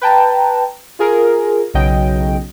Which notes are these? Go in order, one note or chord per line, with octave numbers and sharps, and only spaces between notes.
B4 G5 A5 A#5
F4 G#4 A#4
B1 C#3 F#3 D#5 G5